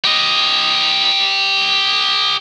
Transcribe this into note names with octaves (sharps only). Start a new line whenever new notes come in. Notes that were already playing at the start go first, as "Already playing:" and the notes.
G4 D#5